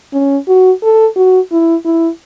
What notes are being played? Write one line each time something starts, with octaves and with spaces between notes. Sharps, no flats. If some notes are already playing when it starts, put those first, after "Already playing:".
C#4
F#4
A4
F#4
E4
E4